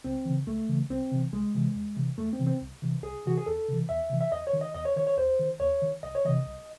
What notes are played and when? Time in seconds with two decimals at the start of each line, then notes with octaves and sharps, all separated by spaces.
0.04 C#2 C4
0.25 C#3 E3
0.47 C#2 A3
0.69 C#3 E3
0.90 C2 C4
1.12 C3 E3
1.33 C2 G#3
1.55 C3 E3
1.75 E2
1.96 C3 E3
2.18 E2 A3
2.33 C4
2.40 C3 E3
2.47 C4
2.61 C2
2.82 C3 E3
3.03 C2 G#4
3.26 C3 E3 F#4
3.38 G#4
3.46 E2 A4
3.68 C3 E3
3.89 E2 E5
4.10 C3 E3
4.21 E5
4.32 E2 D#5
4.47 C#5
4.53 D#3
4.61 D#5
4.75 E2 D#5
4.85 C#5
4.96 D#3 C#5
5.07 C#5
5.17 D#2 C5
5.39 D#3
5.60 D#2 C#5
5.82 D#3
6.03 C2 D#5
6.15 C#5
6.25 C3 E3 D#5
6.45 C2